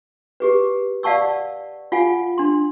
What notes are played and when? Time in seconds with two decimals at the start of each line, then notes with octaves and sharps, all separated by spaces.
0.40 G4 G#4 B4
1.03 D5 F5 F#5 A5 C#6 E6
1.92 F4 F5 F#5 G#5
2.38 D4 C6